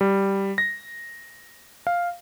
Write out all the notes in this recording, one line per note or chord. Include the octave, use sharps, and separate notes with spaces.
G3
A#6
F5